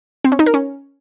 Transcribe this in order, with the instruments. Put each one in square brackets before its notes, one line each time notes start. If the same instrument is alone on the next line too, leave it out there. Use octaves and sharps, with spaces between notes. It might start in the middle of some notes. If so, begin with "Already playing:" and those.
[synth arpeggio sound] C4
C#4
D#4
A#4
C#4